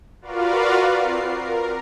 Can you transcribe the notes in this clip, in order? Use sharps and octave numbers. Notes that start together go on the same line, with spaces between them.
F4 F#4 A#4 B4 D5 F5
C4 C7
A#4